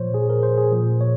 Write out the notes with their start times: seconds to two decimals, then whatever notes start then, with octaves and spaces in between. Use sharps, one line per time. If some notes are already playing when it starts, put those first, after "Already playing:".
Already playing: A#2 F3 C5 C#5
0.14 G#4
0.30 A#4
0.43 C5
0.58 G#4
0.72 A#2 F3
1.01 C#5